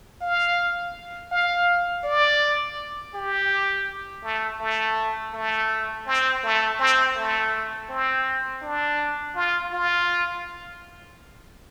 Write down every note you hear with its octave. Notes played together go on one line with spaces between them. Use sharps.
F5
F5
D5
G4
A3
A3
A3
C4
A3
C4
A3
C4
D4
F4
F4